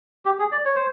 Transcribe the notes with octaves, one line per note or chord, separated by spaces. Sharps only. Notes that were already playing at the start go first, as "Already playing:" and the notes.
G4
G#4
D5
C#5
C5